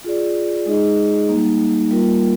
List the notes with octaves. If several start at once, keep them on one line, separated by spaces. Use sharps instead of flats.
F4 G#4 D5
G#3 D#4 G#4 D#5
G3 A#3 D#4
G3 A#3 F4 A#4